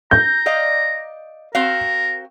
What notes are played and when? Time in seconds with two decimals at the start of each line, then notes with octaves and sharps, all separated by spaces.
0.11 A#5 G6
0.46 D5 D#5 F5
1.55 C4 F#4 A#4 F5